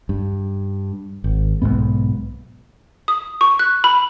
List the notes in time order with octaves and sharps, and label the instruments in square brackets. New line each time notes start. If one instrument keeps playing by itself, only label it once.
[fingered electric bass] G2
G#1
B1 F2 G#2 B3
[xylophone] D#6
C#6
F#6
B5